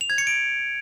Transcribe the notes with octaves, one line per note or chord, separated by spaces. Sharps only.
F7
G#6
C#7
D7